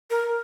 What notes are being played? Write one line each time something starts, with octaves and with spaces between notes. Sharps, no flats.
A#4